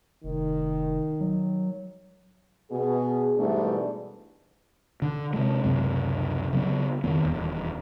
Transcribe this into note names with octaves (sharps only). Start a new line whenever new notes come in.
F1 D#3
F#3
B2 G#4
G#2 B2 E3 G3 A3 D4
D3
C3 G#3
C#2 F#2 C3
C#3 F#3 G#3 B3
F2 D#3 B3
D#1 E2